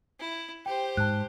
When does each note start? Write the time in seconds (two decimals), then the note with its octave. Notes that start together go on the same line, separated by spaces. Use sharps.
0.20 E4
0.66 G4 C5 G5
0.97 G#2 A5 F#6